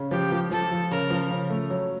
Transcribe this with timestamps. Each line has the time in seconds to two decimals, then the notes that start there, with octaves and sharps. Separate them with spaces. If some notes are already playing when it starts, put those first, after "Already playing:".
Already playing: C#3
0.11 F3 G4
0.32 F3
0.51 F3 A4
0.72 F3
0.91 C#3 A#4
1.10 F3
1.31 C#3
1.50 A3
1.70 F#3